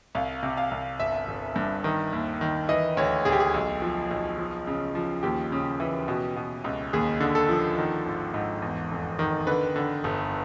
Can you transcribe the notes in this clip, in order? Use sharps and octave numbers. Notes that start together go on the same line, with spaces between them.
C2 F5
C3
F5
C2
G1 E5
G1
G2
D#3
D#2
D#3
E3 D#5
D2 C#5
D2 G#4
G4
G#4
B1
F3
B1
F3
C#3
F3
D#2 G4
C#3
E3
B2
B2
C#2
D#2 G#4
D3
A4
F3
D#3
G#1
G#2
E2
F1
D#3
D3 B4
D3
G1